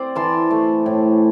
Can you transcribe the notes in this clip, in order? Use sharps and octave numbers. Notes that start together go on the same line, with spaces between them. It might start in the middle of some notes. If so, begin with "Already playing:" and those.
Already playing: C4 C5 D5
E3 A5 C6
A3
A2